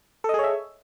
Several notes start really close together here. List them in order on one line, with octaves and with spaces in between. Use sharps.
A4 D#5 G#4 C#5 E5